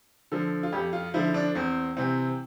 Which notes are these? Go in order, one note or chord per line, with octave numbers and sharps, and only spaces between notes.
D3 F3 A4
F4
F2 G4
F4
D3 F3 E4
D4
E2 C4
C3 E3 C4